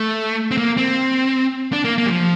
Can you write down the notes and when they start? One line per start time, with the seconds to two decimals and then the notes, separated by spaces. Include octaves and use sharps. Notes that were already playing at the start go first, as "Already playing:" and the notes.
Already playing: A3
0.51 C4
0.57 A#3
0.77 C4
1.73 D4
1.85 A#3
1.98 A#3
2.06 G3
2.11 F3